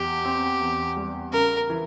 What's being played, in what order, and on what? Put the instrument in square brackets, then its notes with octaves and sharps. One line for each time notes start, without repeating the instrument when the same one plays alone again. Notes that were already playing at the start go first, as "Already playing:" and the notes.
Already playing: [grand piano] E2 [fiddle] G4
[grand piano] C4
E2
G3
[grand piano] C#3 [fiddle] A#4
[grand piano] E3